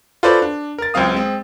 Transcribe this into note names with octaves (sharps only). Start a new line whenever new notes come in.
F4 F#4 A4 B4 C5 D5
D4
A#4 A6
C#2 F#3 C4 F5 D#6
G#3 C4